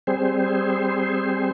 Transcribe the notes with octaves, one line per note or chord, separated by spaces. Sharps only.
G3 C4 G#4 C5